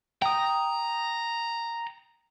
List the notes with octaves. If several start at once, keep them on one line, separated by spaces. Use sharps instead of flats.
G5 A#5 D#6